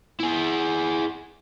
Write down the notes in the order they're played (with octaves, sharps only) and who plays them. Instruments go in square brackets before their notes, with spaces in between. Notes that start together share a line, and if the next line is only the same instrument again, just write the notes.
[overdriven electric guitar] E4 G#4